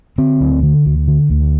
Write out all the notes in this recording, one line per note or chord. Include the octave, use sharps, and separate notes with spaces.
D3 C4
D2
D3
D2
D3
D2